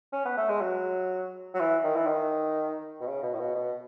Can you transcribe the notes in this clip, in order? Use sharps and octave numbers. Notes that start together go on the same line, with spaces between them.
C#4
B3
A3
G#3
F#3
F#3
E3
D#3
E3
D#3
B2
C#3
B2
A2
B2
B2